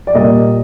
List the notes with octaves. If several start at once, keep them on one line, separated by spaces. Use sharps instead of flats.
D5
A#2 G3 A#3 D#5